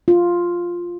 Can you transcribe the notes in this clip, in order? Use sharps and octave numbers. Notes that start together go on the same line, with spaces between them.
F4